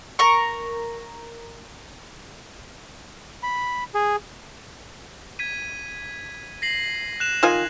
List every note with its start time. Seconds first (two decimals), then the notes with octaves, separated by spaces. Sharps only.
0.19 A#4 A#5 C#6
3.43 B5
3.94 G#4
5.39 G#6 B6 D#7
6.62 A#6 C7 F#7
7.20 F#6 E7 F7
7.43 D#3 F4 G#5